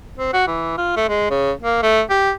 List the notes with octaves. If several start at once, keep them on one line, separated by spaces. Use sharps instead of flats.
C4
F#4
E3
F4
A3
G#3
C#3
A#3
A3
G4